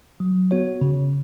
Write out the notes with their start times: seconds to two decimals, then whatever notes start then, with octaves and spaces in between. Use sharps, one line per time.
0.20 F#3
0.51 B3 F#4 C#5
0.81 C#3